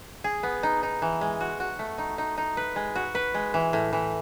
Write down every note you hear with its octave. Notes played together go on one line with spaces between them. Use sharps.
G#4
B3
D#4
D#4
E3
G#3
F#4
F#4
A3
D#4
D#4
D#4
B4
G#3
F#4
B4
G#3
E3
A2
E3